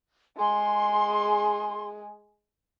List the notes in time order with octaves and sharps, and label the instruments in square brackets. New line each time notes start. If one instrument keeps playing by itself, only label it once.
[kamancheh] G#3 G#4 [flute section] C6